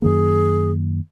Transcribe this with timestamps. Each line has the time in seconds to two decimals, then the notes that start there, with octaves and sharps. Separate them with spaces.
0.02 F#2 D#3 A#3 G#4